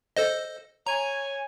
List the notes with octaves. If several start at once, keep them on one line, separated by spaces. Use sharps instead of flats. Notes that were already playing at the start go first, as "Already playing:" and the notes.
A4 C5 D#5
C#5 G#5 A#5